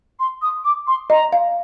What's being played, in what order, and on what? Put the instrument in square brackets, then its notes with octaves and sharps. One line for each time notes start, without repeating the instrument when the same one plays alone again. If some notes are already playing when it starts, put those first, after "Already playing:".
[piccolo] C6
D#6
D6
C6
[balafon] D#5 [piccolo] A#5
[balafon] F5